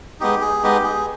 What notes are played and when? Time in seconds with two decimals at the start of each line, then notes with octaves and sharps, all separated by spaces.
0.20 G#3 B3 D#4 G4
0.41 G#4
0.63 G#3 B3 D#4 G4
0.84 G#4